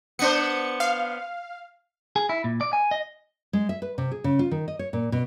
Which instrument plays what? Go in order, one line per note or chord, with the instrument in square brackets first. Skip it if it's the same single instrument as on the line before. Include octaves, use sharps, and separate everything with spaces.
[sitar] B3 D4 C5 [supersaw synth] C#7
[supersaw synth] F5
[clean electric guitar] G#4
E4
A#2
D5
G#5
D#5
[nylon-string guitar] G#3
E5
B4
C3
G#4
C#3
F4
D#3
D#5
C#5
A#2
B2